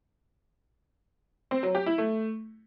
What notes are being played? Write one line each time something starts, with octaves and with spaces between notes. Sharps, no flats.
C4
F#3
G4
E4
A3